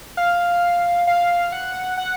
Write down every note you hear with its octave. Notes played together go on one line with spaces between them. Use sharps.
F5
F5
F#5
F#5